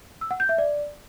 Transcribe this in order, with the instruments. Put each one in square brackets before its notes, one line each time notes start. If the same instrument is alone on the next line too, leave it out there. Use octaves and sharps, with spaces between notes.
[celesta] E6
F#5
G6
E5
D5